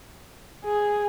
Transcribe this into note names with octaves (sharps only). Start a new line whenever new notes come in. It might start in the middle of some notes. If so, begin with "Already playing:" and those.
G#4